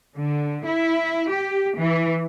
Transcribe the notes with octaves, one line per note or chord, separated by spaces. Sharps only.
D3
E4
G4
E3